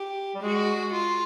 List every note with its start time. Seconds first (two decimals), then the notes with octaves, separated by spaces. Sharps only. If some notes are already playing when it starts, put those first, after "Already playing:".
Already playing: G4
0.35 G3
0.42 G#3 F#4
0.93 F4